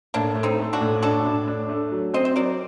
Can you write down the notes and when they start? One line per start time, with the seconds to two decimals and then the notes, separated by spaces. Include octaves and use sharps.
0.14 A2 A#3 D4
0.36 A3
0.43 C4 D#4
0.59 A3
0.73 D4 F#4
0.81 A2
1.02 D4 F#4 A4
1.25 A2
1.48 D4
1.69 A3
1.92 F#3
2.14 C4 C5 D#5
2.25 C5
2.36 F#3 A#4 D5